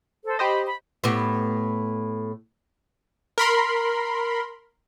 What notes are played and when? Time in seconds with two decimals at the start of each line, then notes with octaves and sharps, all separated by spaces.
0.25 A4 C5
0.39 G4 C5 D#5 B5
0.66 B5
1.04 A2 B3 G4
3.38 A#4 B5 C6